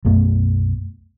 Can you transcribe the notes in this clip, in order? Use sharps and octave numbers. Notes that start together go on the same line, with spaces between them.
B1 F#2 A3 B3